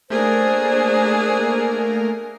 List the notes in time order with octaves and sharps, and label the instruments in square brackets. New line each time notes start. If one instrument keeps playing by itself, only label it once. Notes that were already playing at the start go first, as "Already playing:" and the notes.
[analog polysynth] A3 A#3 A#4 [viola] D4 G#4 [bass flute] C5